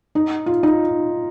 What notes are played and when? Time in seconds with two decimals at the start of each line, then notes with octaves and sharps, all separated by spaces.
0.15 D#4
0.46 F4
0.63 D#4